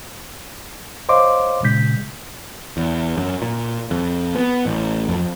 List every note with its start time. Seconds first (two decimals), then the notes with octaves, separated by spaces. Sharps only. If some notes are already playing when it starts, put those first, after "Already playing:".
1.09 C5 C#5 D#5 F5 C6 D6
1.63 A#2 C#3 G#3 G6 B6
2.77 E2
3.18 F#2
3.42 A#2
3.91 F2
4.36 B3
4.66 A1
5.08 F2